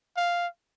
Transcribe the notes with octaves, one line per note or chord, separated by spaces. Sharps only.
F5